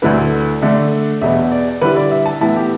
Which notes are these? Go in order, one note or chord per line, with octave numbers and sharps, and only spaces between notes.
D2 D3 A3 E4 B4
D3 A3 D4 E5
E2 B2 B3 E5
D5
D3 G3 E4 B4
D5
E5
A5
A2 E3 B3 E4 A5
G4